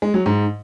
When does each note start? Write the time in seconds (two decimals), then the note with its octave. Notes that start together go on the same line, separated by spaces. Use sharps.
0.02 G#3
0.14 F#3
0.26 G#2